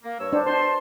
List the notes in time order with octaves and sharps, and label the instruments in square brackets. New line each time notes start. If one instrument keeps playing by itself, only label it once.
[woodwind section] A#3
G2 C#5 E6
[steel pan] D4 C5
[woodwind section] B2 A5 C6 [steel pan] C5